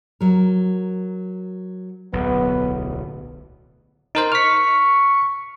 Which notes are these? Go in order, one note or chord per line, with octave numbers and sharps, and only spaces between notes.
F#3 A#4
D1 B1 B3
D#4 A#4 C5
C#6 F6 B6